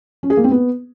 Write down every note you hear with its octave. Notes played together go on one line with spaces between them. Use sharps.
C#4
G#4
A#3
C4
B3